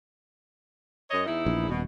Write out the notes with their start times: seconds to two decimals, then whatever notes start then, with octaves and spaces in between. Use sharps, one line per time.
1.11 F#2 C#5 D#5
1.26 E2 D#4 E4
1.46 A#1
1.69 D#1 B2